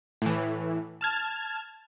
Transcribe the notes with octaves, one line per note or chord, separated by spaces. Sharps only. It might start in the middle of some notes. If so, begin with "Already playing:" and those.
A2 E3
A5 F6 G#6